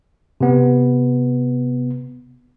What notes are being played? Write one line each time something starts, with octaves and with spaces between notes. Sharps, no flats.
C3 B3